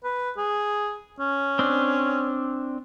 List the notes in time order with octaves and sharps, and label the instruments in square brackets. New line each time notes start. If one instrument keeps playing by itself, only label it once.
[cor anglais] B4
G#4
C#4
[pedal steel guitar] C4 D4